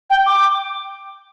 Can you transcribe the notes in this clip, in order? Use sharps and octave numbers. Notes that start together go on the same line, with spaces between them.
G5
D6